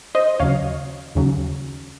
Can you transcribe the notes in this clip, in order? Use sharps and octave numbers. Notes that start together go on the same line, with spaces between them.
C5 D#5
D#2 C#3 F#3 C#5 F5
D#2 C#3 F#3